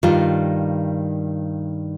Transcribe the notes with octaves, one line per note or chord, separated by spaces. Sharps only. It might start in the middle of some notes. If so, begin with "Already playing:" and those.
G2 D#3 G3 F4